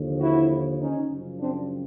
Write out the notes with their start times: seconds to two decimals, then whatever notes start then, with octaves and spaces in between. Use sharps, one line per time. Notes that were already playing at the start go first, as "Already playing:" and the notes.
Already playing: D#2 D3 F3
0.20 E4 F#4
0.80 C#4 D#4
1.10 F#2 C#3 F3
1.40 C4 D4